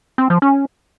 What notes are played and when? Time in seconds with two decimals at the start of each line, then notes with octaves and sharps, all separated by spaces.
0.18 C4
0.30 F3
0.42 C#4